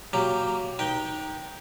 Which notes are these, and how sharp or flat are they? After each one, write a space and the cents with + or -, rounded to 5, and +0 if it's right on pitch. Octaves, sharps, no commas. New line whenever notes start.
F#3 +0 A#3 -5 G4 +0
D#4 +0 B4 -30 G5 +0